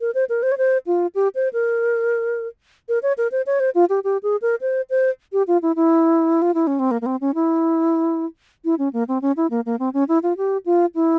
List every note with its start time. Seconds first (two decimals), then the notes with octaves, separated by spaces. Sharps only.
0.01 A#4
0.15 C5
0.29 A#4
0.43 C5
0.52 C#5
0.58 C5
0.87 F4
1.15 G4
1.35 C5
1.53 A#4
2.89 A#4
3.03 C#5
3.18 A#4
3.32 C5
3.46 C#5
3.60 C5
3.75 F4
3.90 G4
4.04 G4
4.23 G#4
4.42 A#4
4.61 C5
4.90 C5
5.33 G4
5.47 F4
5.62 E4
5.76 E4
6.42 F4
6.54 E4
6.67 C#4
6.79 C4
6.91 A#3
7.01 A#3
7.06 C4
7.21 C#4
7.35 E4
8.65 E4
8.79 C#4
8.93 A#3
9.08 C4
9.22 C#4
9.37 E4
9.50 A#3
9.66 A#3
9.79 C4
9.94 C#4
10.08 E4
10.23 F4
10.37 G4
10.66 F4
10.95 E4